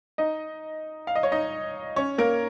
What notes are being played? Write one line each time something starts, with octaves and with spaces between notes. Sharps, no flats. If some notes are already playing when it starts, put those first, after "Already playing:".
D#4 D#5
F5
D#5
C#5
D#4 D#5
C#4 C#5
A#3 A#4